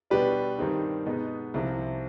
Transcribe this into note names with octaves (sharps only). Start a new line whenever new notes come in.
B2 G3 D4 G4 B4
G2 D#3 G3 C4 D#4
B2 G#3 B3 D#4
C2 C3 F3